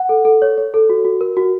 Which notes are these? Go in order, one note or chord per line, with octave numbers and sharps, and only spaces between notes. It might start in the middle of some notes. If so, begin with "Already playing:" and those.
Already playing: F#5
A4
A4
C#5
C#5
A4
F#4
F#4
A#4
F#4